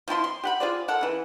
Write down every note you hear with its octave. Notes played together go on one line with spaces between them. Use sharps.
F3 C4 E4 C6
C6
G4 F#5 B5
F4 G#4 C5 D5
A4 A#4 F#5
C#3 E3